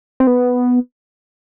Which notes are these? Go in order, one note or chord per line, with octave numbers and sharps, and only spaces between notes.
C4
B3